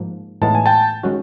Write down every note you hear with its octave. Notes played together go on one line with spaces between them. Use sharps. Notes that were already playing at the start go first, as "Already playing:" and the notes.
Already playing: G#2 F3 A#3
A2 E3 G#3 B3 D#4 A5
G#5
G5 A5
D#3 G#3 C#4 F#4